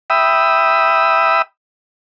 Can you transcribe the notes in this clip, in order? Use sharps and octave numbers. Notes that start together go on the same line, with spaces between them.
E5 G5 B5 D#6 E6